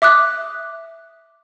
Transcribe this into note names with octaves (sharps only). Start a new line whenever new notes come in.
E5 D6 D#6 F#6